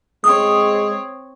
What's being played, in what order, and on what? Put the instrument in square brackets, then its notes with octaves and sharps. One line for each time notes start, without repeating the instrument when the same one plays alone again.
[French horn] G#3 [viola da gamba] C4 C#5 [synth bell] D#6